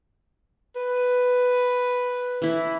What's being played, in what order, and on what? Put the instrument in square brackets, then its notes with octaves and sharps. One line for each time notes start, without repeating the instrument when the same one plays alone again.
[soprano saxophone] B4
[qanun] E3 E4